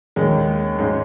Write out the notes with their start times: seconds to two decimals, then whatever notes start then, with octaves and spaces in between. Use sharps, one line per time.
0.16 D#2 D#3 G#3 C#4
0.78 G#2 G#3 C#4